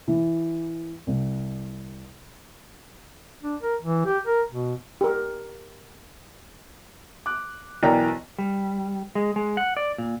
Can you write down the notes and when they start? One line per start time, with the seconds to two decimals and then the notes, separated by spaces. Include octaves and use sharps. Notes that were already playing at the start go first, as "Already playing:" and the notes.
0.08 E3
1.07 C2
3.43 D4
3.62 A#4
3.82 E3
4.06 G4
4.27 A#4
4.50 B2
5.01 G4 A#4
7.26 D6 F#6
7.83 B1 E3 A#4 D5 G5 A#5
8.38 G3
9.15 G#3
9.36 G#3
9.57 F#5
9.77 D5
9.98 A#2